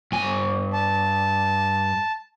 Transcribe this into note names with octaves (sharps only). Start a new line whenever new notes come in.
G2 G#5
A5